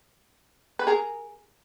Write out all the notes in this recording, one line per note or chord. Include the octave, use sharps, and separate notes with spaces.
B4
G#4 A#4